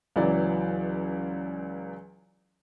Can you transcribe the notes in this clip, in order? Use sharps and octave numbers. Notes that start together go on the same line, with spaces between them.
C#2 E3 F#3 D5